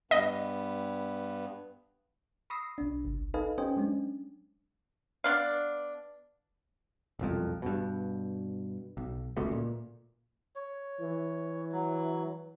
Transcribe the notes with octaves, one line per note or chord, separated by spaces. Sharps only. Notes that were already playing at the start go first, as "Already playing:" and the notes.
G2 B3 D#5
B5 C#6 D#6 E6 A#6 C7
B1 D4
G1 C2
D#4 A4 B4 D#5 F5 G#5
C#4 G4 C5 D#5 G5 G#5
F#3 G#3 C#4 D4
B3 D4 F5
E1 C2 F2
G2 B2
B1
D1 C#2 B2 A3
A#2
C#5
E3
F#3